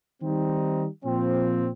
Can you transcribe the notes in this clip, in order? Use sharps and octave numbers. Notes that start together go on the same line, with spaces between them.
D#3 G3 C4 D#4
A#2 F3 C4